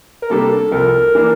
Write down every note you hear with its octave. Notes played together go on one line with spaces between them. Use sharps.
A#4
C3 G3 A#3 D4 G4 A4
C2 C3 F3 A#4
E3 A#3 D4